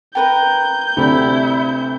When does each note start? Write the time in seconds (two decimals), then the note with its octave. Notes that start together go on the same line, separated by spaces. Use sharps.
0.15 A#4 B4 G5 G6
0.97 D2 C3 D4 E4